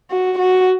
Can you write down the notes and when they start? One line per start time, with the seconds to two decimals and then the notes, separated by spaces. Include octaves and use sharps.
0.10 F#4
0.39 F#4